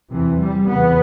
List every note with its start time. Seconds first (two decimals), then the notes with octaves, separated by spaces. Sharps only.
0.11 E2 C3 E3
0.40 G3
0.68 E2 C#3 B3